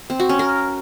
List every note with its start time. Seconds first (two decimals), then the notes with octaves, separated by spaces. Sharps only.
0.10 C4
0.20 F#4
0.29 C#4
0.39 A#4